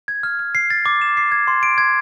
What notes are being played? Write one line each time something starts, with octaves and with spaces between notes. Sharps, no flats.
G#6
F6
F6
C7
A6
D6
E7
C7
G#6
C6
D7
G#6